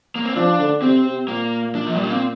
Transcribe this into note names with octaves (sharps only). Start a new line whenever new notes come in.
A#3
C4
F3 D4
D3
C3 C4
C3
A#2 A#3
D4
F3
G3
A#3
C4